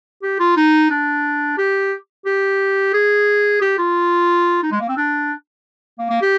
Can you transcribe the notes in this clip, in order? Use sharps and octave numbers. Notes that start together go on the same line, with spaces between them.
G4
F4
D#4
D4
G4
G4
G#4
G4
F4
D#4
G#3
A#3
C4
D4
A#3
A#3
G4